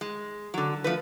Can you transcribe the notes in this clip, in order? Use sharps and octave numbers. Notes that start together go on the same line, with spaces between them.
G#3
D3 F#3
F3 A3 B4